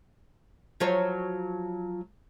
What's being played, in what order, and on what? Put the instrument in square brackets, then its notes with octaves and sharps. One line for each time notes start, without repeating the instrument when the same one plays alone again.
[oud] F3 F#3 C#5